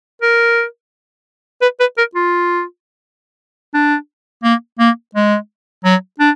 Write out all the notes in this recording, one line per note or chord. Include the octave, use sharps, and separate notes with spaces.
A#4
B4
B4
A#4
F4
D4
A#3
A#3
G#3
F#3
D4